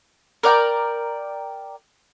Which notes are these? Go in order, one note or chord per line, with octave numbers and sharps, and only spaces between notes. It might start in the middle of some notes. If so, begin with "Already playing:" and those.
A#4 D5 F#5 G5